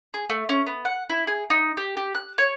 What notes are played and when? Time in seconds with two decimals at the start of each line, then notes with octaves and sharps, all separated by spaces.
0.14 G#4
0.30 A3
0.49 C#4
0.67 B3
0.85 F#5
1.10 E4
1.27 G#4
1.50 D#4
1.77 G4
1.97 G4
2.15 F#6
2.38 C#5